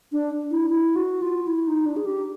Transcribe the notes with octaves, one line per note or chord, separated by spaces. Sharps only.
D4
E4
E4
F#4
F4
E4
D#4
D4
G#4
G4